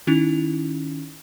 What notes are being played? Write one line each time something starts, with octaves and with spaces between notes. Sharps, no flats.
D#3 C#4 D#4 E4 F7